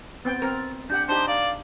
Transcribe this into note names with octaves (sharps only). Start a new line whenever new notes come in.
B3 C4 G5 A6
C4 A#4
D4 G4 F#5 G6
D4 D#4 G4 C5 A5
D5 F5